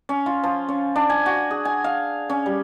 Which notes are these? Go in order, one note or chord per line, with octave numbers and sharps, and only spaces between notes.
C#4
F4
F3
C#4
D4
G#5
F#4
G#4
G#5
F5
C#4
G3